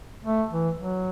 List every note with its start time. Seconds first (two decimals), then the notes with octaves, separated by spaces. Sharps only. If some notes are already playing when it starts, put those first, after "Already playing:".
0.25 A3
0.51 E3
0.77 F#3